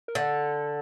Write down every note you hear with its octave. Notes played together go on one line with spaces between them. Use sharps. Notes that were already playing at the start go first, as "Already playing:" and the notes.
A#4
D3 A4